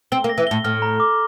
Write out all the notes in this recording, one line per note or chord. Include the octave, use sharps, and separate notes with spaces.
C4 G7
A#3
A#6
E3
A2 G7
A2 F6
A#5
D6